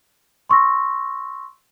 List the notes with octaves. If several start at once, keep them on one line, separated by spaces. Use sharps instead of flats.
C6 C#6 E6 A#6